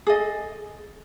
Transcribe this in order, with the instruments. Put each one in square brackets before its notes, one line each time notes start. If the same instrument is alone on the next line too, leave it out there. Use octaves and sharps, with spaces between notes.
[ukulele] G#4 A4 D#5